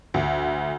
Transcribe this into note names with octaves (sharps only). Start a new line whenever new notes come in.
D2